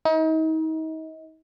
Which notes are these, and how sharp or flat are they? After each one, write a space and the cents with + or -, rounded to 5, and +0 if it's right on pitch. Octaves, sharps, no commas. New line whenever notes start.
D#4 +35